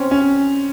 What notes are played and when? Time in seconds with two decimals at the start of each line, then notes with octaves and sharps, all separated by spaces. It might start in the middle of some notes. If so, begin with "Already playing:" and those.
Already playing: C4 C#4
0.11 C#4